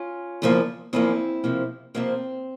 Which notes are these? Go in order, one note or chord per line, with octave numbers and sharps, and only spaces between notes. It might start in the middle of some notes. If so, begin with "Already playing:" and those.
Already playing: C#4 F4
E2 C#3 F3 A#3
E2 C#3 F3 A#3 C4 E4
F2 C3 F3 A#3
F2 C3 F3 A#3 C4